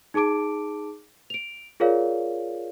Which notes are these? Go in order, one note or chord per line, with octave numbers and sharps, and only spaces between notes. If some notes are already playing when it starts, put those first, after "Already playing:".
D#4 G#4 A5 D6 D7
D7 F7
F4 G#4 A#4 C#5 D5 F5